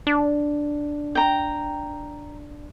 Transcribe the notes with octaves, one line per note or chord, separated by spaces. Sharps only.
D4
G5 A#5